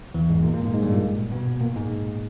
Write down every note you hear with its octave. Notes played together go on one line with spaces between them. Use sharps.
E2 E3
G#2 G#3
A#2 A#3
A#2 A#3
G#2 G#3
G#2 G#3
G2 G3
A#2 A#3
B2 B3
A#2 A#3
G#2 G#3